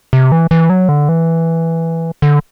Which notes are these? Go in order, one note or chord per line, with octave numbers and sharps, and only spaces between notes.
C3
E3
E3
F#3
D3
E3
D3